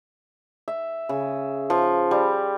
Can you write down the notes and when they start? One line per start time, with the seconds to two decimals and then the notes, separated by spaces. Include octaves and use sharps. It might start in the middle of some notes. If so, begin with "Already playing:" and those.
0.68 E5
1.09 C#3
1.70 F3
2.11 G3